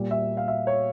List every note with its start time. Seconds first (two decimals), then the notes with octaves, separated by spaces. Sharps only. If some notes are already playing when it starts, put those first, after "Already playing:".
Already playing: A#2 G3
0.11 E5
0.37 F5
0.48 E5
0.67 C#5